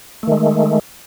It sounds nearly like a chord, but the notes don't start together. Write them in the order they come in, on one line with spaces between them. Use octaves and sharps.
A3 D#3 G#3